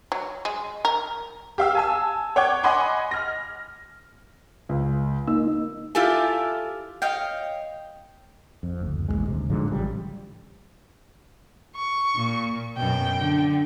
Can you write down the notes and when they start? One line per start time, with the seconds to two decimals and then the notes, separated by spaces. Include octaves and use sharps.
0.12 F#3
0.45 G#3
0.85 A#4
1.58 G4 F5 E6
1.75 G#5 A5 E6
2.36 C#5 F#5 G5 D6 G#6
2.63 D#5 F#5 G#5 B5 C6 D6
3.11 F6 A#6
4.69 C#2
5.28 A#3 D#4 E6
5.95 E4 F4 G4 A4 G#5
7.02 C#5 D#5 F5 G5
8.63 F2
8.81 F#1 D2
9.08 A1 D#2 A2 G#3
9.28 D1 D2 C3
9.50 G#2 D3 F3 F#3
9.71 A1 C#3 F3 G3
11.75 C#6
12.15 A#2
12.77 F#2 B2 G5
13.19 D3